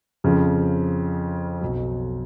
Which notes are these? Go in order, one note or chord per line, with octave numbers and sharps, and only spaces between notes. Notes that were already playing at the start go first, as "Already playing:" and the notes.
F2 C#3 F3
B1 B2 F#3